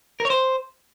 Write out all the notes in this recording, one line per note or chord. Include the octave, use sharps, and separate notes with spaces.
A#4
C#5
C5